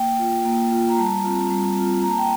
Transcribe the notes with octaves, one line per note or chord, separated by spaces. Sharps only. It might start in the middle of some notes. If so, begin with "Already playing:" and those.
Already playing: A#3 G5
F4
A#3
F4
A#5
G3 A5
C4 F4
G3
C4 F4
A#3 A#5
A5
G5